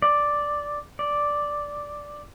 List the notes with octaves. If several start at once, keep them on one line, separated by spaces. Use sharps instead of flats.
D5
D5